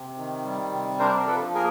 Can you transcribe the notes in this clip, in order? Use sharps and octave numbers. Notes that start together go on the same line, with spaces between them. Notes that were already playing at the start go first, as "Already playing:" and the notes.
Already playing: C3
D#3
G3
C3
D4 A#4 C5
A#4
F3 A4 B4
A#3 G#4 A#4